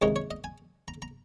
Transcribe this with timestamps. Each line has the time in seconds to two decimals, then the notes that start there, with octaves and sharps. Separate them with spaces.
0.02 C#2 C3 D#3 G#3 D#4 C#5
0.16 C#5
0.31 D#5
0.44 G#5
0.88 A#5
1.02 A#5